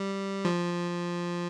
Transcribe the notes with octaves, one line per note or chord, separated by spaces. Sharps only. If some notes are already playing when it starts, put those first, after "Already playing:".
Already playing: G3
F3